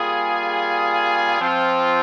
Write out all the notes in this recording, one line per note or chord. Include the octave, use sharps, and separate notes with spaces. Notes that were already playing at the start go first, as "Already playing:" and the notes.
Already playing: G3 A#3 F4 G#4
F3 C4 F4